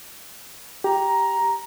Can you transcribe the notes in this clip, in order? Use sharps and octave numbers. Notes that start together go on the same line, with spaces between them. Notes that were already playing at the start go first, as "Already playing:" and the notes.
G4 A#5